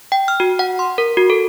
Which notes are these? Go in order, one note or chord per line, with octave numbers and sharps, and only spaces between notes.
G5
F6
F#4
F#5
C6
A#4
F#4
A4